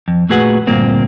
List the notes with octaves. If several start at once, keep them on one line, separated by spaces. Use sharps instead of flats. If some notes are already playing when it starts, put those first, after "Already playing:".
F2
A#2 A3 F#4 G#4 B4 F#5
D2 G2 A#2 A#3 C4